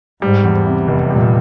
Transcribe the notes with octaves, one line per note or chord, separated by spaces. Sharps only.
G#2 G3
E2
C3
F1
A#2 G3